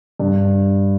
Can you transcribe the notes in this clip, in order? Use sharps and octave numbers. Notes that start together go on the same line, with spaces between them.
G2